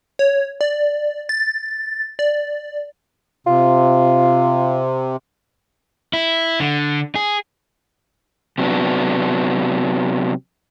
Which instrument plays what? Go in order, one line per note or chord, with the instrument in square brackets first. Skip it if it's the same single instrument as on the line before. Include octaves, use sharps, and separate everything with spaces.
[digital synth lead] C#5
D5
A6
D5
[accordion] C3 [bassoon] F4
[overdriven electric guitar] E4
D3
G#4
[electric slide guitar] C3 F#3 B3 D4